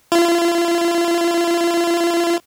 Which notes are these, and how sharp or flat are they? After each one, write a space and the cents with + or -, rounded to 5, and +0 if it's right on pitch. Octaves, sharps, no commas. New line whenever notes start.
F4 -40